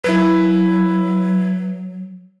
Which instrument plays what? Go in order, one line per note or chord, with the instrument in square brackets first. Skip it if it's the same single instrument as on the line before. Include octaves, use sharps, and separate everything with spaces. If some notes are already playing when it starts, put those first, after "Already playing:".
[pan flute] F#3 [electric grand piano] E4 B4